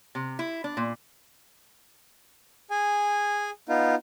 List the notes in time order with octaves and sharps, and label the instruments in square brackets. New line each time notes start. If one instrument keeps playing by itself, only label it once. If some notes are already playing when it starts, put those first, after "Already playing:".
[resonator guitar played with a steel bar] C3
E4
D4
A#2
[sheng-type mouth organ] G#4 G#5
B3 D#4 F4